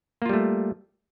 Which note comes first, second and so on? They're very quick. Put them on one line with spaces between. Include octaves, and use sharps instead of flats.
A#3 F4 G3 A3